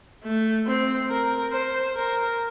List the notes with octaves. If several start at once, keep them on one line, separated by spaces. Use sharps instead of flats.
A3
C4
A#4
C5
A#4